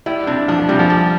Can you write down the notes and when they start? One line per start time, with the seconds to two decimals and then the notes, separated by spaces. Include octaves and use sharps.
0.06 G3 E4
0.27 C3 D4
0.48 F3 D4
0.59 F3
0.68 C3 G3
0.79 F3
0.90 G3